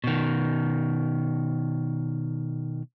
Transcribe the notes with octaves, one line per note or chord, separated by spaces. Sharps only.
B2 D#3